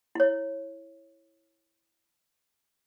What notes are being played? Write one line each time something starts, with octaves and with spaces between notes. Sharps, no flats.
E4 C#5